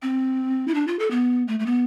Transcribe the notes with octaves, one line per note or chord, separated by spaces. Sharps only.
C4
E4
D4
F4
A4
B3
A3
A3
B3